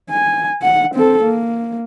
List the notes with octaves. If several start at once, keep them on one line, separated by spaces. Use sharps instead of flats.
G#5
F#5
C4 A4
A#3